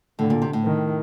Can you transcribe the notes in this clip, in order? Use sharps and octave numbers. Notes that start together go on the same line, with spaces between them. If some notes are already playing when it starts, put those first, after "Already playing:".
A2 D3
A#2
C3
A2
D#3